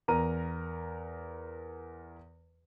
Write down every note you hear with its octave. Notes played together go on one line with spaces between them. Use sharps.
E2 A#4 A#5 D#7